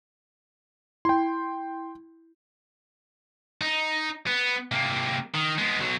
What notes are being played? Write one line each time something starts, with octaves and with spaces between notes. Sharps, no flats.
E4 G5 C6
D#4
B3
C3 A#3
D#3
G#3 B3
B1 F#3